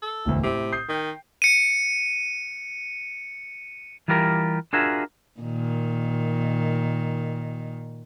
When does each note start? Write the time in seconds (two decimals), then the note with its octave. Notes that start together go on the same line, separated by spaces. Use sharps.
0.02 A4
0.25 E1 A1 D2
0.43 A2 C3
0.72 D#6 G6 C7
0.89 D#3 G5
1.42 C#7 D#7
4.08 E3 G3 F4 G4 A#4
4.73 D4 F4 F#4 G#4 A#4 E5
5.41 A#2 D#3